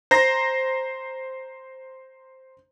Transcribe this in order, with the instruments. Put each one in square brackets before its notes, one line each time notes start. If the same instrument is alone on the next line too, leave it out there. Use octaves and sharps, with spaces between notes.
[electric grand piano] C5 A#5 A#6